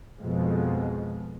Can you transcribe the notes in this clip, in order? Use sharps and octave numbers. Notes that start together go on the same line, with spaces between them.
F2 B2 F3 G#3